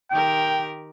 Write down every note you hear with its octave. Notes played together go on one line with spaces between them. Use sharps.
D#3 G4 A#4 G5